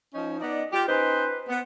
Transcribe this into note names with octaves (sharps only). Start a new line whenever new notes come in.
F3 C#4 D#4
B3 D#4 D5 D#5
F4 G4
C#4 D#4 B4 C5
B3